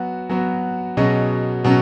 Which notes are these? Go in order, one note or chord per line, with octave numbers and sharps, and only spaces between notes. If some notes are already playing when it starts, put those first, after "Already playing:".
Already playing: F#3 B3 F#4
F#3 B3 F#4
B2 F#3 C#4 G#4 D#5
B2 F#3 C#4